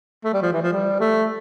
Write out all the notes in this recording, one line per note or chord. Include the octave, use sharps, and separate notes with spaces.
A3
G3
F3
E3
F3
G3
A3